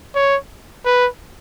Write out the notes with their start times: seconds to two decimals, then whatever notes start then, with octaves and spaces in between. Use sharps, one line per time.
0.15 C#5
0.85 B4